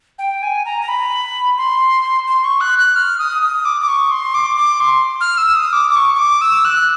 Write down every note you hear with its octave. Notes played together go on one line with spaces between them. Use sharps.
G5
G#5
A#5
A#5
B5
C6
C6
C#6
F#6
F#6
F6
D#6
D#6
D6
D6
C#6
C6
D6
D6
C6
F6
E6
D#6
D6
D6
C#6
C#6
D6
E6
F#6